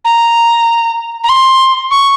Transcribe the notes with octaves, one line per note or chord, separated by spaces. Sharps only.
A#5
A#5
C6
C#6